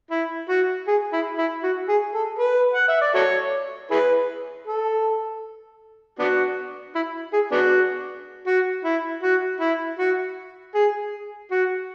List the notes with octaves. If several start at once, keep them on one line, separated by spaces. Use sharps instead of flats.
E4
F#4
G#4
E4
E4
F#4
G#4
A4
B4
F#5
E5
D5
F#4 A4 C#5
E4 G#4 B4
A4
B3 D4 F#4
E4
G#4
B3 D4 F#4
F#4
E4
F#4
E4
F#4
G#4
F#4